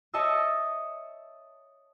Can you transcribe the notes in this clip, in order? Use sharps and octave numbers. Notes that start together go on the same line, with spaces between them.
C#5 D#5 E5 A5 E6